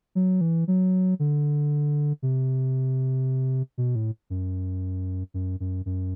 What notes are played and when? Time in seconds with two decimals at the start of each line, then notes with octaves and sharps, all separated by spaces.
0.15 F#3
0.41 E3
0.68 F#3
1.19 D3
2.22 C3
3.78 B2
3.95 A2
4.30 F#2
5.34 F#2
5.60 F#2
5.86 F#2